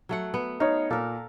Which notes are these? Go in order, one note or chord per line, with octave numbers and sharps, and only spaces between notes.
F#3 A3 F#5
B3
D#4 C#5 F5
A#2 A4 A#4